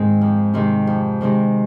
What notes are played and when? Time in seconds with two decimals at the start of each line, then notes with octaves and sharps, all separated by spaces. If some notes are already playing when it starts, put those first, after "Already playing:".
Already playing: G#2 D#3 G#3 C4
0.21 F2
0.54 C3 D#3 G#3 C4
0.87 F2
1.21 C3 D#3 G#3 C4